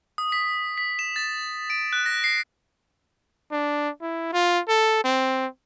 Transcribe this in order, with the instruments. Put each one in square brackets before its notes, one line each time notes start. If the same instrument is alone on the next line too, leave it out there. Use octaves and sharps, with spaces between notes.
[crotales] D#6
B6
B6
E7
A6
D7
F#6
A#6
C7
[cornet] D4
E4
F4
A4
C4